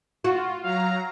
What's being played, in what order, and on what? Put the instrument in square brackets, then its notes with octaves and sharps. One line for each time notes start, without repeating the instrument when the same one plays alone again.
[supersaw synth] F4 [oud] F#4
[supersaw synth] F#3 A#5 [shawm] F5